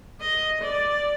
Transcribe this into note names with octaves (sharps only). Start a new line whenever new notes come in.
D#5
D5